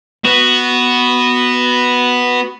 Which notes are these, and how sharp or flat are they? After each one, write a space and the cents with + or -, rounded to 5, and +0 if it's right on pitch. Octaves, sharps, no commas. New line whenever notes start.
B3 +0 F#4 +0